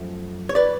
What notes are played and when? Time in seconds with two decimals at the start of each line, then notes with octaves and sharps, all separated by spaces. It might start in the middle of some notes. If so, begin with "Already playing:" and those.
Already playing: F#2 F3 A3
0.49 C#5
0.55 B4 D5